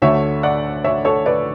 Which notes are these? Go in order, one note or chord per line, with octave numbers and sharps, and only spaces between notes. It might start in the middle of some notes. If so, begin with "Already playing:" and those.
D2 D3 A3 C#5 E5
D5 F#5
C#5 E5
A4 C#5
B4 D5